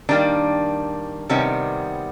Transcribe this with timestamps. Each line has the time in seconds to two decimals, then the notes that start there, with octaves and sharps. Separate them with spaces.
0.09 D#3 G3 A#3 D4
1.29 C3 D#3 G3 B3 C#4